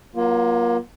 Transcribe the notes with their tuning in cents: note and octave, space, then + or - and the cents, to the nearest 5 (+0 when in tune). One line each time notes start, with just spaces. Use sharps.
F#3 +0 A#3 +30 F4 +0